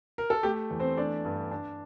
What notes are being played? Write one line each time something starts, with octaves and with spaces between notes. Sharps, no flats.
A#4
A4
A3 G4
E2
C4 C5
A3 D4 D5
G2
D4